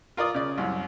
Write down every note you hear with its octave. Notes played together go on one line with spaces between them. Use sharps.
F4 A#4 D5 D#6
C#3 D5
C2 F#2